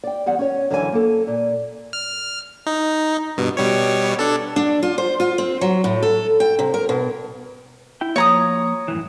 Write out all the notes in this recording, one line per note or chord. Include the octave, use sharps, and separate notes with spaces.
D5 G5
E2 G3 F#5
C#4 C#5
F#2 D3 E3 C#4 G4 G#5
A#3 A4
A#2
F6
D#4
G2 B2
B2 G3 C#5
D4 A4
D4
F4
C5
F4
C4
F#3
A2
A4
G5
C3
A#4
B2
E4 G5
F3 A#3 C#5 A#5 D#6
F#2 A2 E3